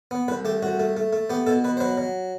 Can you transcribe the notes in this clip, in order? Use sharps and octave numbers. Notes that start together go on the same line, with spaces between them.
B3
C2 B4
A3 G4
C2 F#4
A3
A3
A3
B3 G4
B2 A4
B2 B4
C5
F#3 B4
F#3